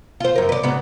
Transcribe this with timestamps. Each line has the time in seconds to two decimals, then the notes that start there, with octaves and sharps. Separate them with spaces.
0.20 F4 C5
0.36 F#2 A#4
0.49 B4 D5
0.63 G#2 C#3 B3